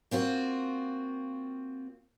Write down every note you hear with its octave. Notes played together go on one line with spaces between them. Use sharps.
A#3 C4 F4 F#4